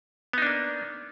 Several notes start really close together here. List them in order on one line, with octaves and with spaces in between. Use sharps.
B3 D#4 D4 A#3